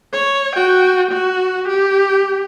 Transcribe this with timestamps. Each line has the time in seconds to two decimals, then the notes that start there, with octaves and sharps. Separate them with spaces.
0.12 C#5
0.55 F#4 G5
1.11 F#4
1.68 G4